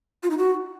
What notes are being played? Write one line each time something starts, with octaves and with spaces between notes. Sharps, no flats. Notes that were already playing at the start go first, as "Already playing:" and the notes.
F4
D#4
F#4